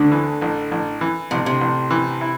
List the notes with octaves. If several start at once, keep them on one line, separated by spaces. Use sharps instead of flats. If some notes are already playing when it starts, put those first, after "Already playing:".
Already playing: D2 D3
E3
A1
A1
E3
A1 C3
C3
A1
E3
E4